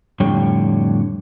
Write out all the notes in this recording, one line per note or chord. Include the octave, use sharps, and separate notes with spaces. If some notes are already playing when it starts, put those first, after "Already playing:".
F2 A2 D3 G3 C#5 G5